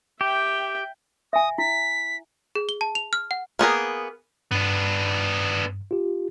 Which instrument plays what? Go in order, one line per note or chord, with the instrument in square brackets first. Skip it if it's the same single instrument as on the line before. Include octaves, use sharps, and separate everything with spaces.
[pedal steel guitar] G4 [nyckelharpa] E5 G5
[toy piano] E5 G#5 [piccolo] D#6
[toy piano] E4 [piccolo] B6
[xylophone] G#4
G7
A5
F7
F6
F#5
[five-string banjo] A#3 B3 G#4 A#4
[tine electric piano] G2 [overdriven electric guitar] B3 D4
[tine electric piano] F4 G4